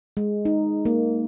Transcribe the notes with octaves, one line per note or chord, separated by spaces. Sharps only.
G#3
D#4
A#3